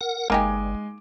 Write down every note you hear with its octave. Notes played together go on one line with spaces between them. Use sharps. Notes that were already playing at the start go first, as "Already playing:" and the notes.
A#4 F#5
G1 G#3 A#3 D#4 G4 G#5 D6